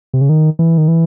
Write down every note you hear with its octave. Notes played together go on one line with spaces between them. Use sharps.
C3
C#3
D#3
E3
D#3
E3